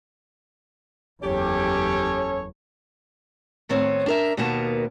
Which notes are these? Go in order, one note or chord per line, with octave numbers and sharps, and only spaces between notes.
F#1 E2 C#4 G4 A4 C#5
A2 D#3 B3 C4 C#5
D4 A#4 E5
D#2 B2 D#3 A#3 B3 A5